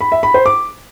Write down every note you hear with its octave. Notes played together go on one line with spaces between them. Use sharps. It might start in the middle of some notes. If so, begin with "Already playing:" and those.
B5
E5
B5
C5
D6